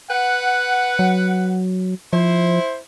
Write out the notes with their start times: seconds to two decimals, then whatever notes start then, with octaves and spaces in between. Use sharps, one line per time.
0.10 B4 F#5
0.99 F#3
2.13 F3 E4 C5